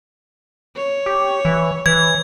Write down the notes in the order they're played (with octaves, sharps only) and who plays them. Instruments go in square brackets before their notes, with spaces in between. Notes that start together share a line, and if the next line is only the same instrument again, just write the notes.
[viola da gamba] C#5
[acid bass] G4
E3
[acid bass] E3 [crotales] G#6